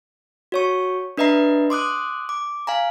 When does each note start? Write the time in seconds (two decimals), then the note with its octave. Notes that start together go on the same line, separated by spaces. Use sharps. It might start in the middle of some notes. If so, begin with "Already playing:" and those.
0.52 F#4 C#5 C#6
1.18 D4 B4 D#5 E5 A#5 C7
1.70 C6 D6 D#6 F#6
2.29 D6
2.67 F5 G#5 A#5